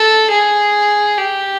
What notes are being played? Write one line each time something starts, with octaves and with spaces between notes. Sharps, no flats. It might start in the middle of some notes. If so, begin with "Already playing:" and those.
Already playing: A4
G#4
G4